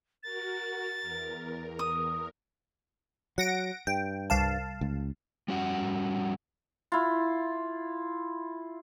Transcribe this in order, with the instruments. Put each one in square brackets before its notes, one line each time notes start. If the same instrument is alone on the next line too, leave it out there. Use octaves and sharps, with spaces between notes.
[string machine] F#4 A#4 [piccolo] A6
[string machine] E2 A#4
[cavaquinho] D#6
[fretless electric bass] F#3 [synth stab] F#5 A#6 D7
[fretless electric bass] G2 [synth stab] G5
[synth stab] C2 F5 A5
[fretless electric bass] C#2
[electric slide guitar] G3 C#4 F#4 F#5
[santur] E4 F4